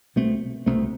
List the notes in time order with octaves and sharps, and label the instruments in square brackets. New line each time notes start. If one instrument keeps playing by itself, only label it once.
[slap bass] C2 B2 A3 C4
C2 B2 A3 C4